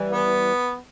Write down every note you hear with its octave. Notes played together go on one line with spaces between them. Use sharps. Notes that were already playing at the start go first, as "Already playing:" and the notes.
Already playing: E3 G3
B3